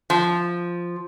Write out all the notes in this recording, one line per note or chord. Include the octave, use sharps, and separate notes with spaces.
F3